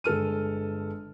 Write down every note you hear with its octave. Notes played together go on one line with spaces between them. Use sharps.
G1 G#3 A4 F6 D#7